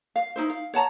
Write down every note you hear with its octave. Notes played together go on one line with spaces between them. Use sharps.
F5
D#4 E4 C5
F5
C#5 F#5 A5 A#5